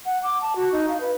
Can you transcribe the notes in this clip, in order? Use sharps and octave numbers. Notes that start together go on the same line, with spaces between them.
F#5
D6
A5
F#4
D#4
F5
B4